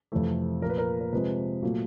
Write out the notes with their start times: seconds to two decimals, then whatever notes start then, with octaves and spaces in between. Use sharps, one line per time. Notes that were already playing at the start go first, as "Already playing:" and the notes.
0.12 F2 C3 E3 A3
0.62 A#2 F3 A#3 A#4
0.70 B4
0.78 A#4
1.01 A#4
1.13 C3 F3 G#3 B4
1.63 A#2 F#3 A3